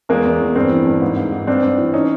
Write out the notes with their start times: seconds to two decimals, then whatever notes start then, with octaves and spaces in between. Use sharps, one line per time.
0.09 E2 G#3 A#3
0.25 E2
0.40 E2
0.55 G2 A#3 C4
0.70 E3
0.87 G2
1.02 G#2
1.17 G#2
1.32 G#2
1.47 G2 C4 D4
1.63 G2
1.78 E3
1.93 C#4 D#4